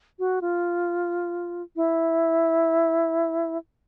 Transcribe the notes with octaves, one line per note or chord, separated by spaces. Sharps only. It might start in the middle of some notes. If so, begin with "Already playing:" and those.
F#4
F4
E4